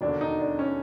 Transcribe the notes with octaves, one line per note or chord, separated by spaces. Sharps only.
E1 D#2 D3 D4
D#4
D4
C#4